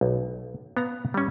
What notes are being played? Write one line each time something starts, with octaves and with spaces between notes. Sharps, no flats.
B1
B3 F5 A#5
G3 C#4